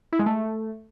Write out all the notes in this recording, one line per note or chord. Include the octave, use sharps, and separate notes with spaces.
E4
G#3
A3